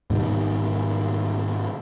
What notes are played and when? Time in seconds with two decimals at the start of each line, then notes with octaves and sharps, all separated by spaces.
0.10 G#2 B2 D#3 G3